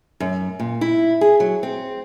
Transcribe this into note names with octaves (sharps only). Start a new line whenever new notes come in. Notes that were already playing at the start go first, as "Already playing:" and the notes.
F#2
A#2
E4
G#4
F#3
C4